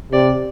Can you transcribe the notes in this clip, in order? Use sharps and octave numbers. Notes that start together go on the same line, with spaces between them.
C3 D5